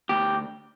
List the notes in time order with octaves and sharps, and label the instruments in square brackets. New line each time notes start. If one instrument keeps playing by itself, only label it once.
[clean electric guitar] D2 G4